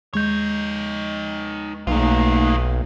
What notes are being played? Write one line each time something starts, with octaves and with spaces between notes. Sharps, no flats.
D#2 G#3 D#4 C#5 G6
B1 D#3 A3 A#3 D#4 F4